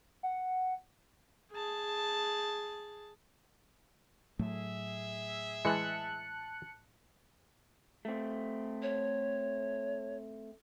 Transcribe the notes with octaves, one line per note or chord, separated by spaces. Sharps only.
F#5
G#4 A5
A2 F#3 A3 G#4 E5
E3 G#3 A5 F#6 C#7
A3 C4
C#5